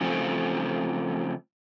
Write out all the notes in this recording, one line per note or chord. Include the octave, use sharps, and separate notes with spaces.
C#3 F3 A3 C4